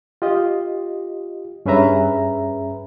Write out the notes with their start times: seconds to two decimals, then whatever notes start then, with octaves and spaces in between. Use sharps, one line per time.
0.22 F4 G4 D#5
1.66 G2 C#4 G#4 B4 E5 A#5